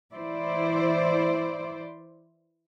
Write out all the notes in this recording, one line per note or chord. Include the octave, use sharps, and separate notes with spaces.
E3 E4 C5 D5